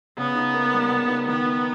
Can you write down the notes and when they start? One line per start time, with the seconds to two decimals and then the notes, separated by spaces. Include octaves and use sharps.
0.18 C#3 B3
0.36 D#4
0.54 A#3
0.73 G3
0.92 C#3
1.09 D#4
1.28 D#3 B3
1.46 D#4